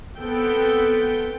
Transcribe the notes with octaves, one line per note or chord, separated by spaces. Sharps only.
B3 C4 A4 G5